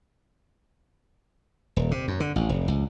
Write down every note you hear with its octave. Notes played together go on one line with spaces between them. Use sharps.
D#1
C3
F#2
D3
A1
F1
C#2